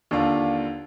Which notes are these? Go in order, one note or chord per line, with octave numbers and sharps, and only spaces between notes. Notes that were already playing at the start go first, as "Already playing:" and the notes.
D#2 D3 D4 F4